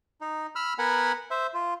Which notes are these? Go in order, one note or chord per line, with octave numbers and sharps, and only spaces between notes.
D#4
B5 E6 F6
B3 A#4 F#5 G#5 B5
C5 E5
F4